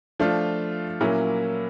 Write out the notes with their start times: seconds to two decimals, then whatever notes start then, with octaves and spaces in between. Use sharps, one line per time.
0.20 F3 A3 D4 F4
1.00 A#2 F#3 A#3 C#4 E4